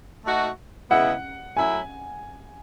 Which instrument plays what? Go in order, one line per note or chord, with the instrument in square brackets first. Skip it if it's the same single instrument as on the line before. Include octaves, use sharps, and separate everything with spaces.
[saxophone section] A3 D#4 F#4
[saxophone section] C#3 G#3 B3 E4 [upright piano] F#5
[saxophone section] F#3 A3 E4 [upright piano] G#5